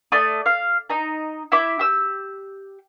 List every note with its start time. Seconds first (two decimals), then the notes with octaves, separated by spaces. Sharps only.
0.12 A3 D5 D#6
0.46 F5
0.90 D#4 A#5
1.52 E4 E5 D6
1.79 G4 E6